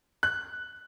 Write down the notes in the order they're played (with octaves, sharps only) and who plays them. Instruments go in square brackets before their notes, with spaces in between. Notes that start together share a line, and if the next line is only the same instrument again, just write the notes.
[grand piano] F#6